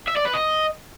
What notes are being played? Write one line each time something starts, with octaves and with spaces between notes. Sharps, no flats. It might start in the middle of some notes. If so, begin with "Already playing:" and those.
E5
D5
B4
D#5